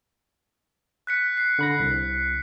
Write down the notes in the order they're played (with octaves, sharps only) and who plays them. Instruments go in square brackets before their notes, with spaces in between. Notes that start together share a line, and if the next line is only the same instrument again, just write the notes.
[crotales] F#6 B6 C#7
C7
[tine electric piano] D3 B5 A#6
C2